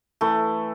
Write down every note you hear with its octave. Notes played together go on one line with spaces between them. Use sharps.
E3 A3